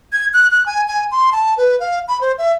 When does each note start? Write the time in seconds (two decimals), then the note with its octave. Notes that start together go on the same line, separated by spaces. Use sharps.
0.13 G#6
0.34 F#6
0.51 F#6
0.66 G#5
0.88 G#5
1.11 C6
1.32 A5
1.58 B4
1.80 F5
2.08 B5
2.21 C5
2.38 E5